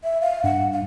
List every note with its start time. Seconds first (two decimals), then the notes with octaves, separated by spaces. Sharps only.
0.04 E5
0.21 F5
0.44 G2 F#5
0.73 F5